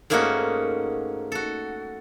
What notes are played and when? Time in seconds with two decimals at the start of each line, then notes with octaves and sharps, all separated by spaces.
0.10 G#2 A3 A#3 C#4 D#4 F#4
1.32 F#4 A4